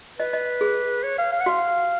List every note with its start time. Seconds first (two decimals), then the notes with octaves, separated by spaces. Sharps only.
0.19 B4 D#5
0.33 D#5
0.61 G#4
1.03 C#5
1.18 F5
1.32 F5
1.40 F#5
1.46 F#4 F5